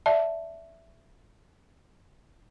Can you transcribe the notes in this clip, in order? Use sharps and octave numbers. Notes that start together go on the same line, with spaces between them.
D5 E5 A5